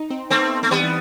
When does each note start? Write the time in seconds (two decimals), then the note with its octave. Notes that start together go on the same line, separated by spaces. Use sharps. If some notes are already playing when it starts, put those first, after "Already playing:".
Already playing: D#4
0.10 C4
0.30 A3 B3 C4
0.63 A3
0.71 E3 G3 B3
0.84 E3